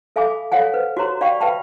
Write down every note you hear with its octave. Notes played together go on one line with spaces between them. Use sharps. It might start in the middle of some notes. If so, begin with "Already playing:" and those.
A4 E5 F5 G#5 B5 D6
A4 C#5 F5 F#5 G#5
B4 C5
F#4 G4 C#5 A#5 C6
D5 F5 G5 B5 C#6
B4 E5 F5 G5 A5 B5